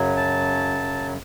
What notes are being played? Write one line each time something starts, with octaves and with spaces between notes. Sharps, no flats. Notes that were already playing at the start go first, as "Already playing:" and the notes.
Already playing: F#2 C#3 F#3
A5